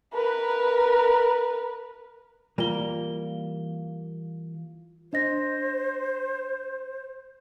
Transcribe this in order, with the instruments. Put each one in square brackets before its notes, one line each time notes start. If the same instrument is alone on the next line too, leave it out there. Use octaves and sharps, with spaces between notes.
[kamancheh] A#4 B4
[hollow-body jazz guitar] E3 G3 A#3 [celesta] F4 G7
[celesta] D4 D#5 A#6 [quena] C5